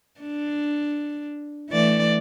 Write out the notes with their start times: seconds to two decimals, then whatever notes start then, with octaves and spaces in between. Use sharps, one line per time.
0.20 D4
1.70 E3 A3 D5